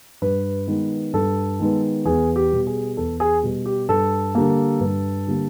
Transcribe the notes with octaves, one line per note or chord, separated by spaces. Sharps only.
G2 B4
D#3 G#3 B3
G2 A4
D#3 G#3 B3
E2 G#4
G4
B2 G3
G#4
E2 A4
G#4
B2 G3
G4
G2 A4
D3 G3 A#3
G2
D3 G3 A#3